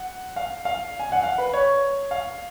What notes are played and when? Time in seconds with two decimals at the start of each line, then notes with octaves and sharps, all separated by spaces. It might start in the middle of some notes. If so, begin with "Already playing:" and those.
Already playing: F#5
0.36 F5
0.65 F5
0.99 G#5
1.12 F#5
1.23 F5
1.38 B4
1.53 C#5
2.11 F5